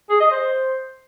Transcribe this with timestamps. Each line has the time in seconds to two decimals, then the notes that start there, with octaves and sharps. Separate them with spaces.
0.09 G#4
0.20 D#5
0.31 C5